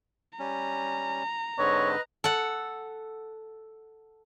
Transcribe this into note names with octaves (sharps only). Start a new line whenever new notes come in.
G3 C#4 A#5
G#2 D3 C4 B4 C#5 D#5
A4 F#5